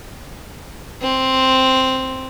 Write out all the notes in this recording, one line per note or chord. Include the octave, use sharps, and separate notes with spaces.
C4